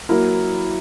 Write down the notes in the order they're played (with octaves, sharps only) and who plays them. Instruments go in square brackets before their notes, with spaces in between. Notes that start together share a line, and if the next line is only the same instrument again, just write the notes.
[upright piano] F#3 A#3 E4 A#4